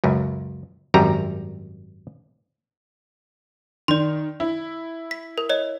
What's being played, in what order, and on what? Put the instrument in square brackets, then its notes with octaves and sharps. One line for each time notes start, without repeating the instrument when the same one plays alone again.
[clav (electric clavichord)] C#2 F#2
G#1 F#2 G3 A#5
[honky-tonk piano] D#3 [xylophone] D5 C6
[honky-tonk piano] E4
[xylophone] B6
A#4
C#5 D#5